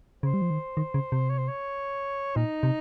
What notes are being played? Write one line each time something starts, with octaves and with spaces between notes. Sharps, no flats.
C#3 C5
G3
F3
D#3
D#3
C#3
C3
C#5
C5
C#5
A#2 D#4
C3